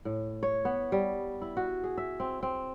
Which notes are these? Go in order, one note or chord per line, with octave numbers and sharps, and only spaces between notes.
A2
C#5
B3
G3
E4
F#4
G#4
E5
C4
C4